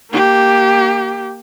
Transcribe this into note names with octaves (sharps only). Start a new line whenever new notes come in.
A#3 G4